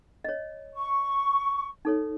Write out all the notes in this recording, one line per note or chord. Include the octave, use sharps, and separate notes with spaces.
C#5 D#5
C#6
D#4 A4 C#5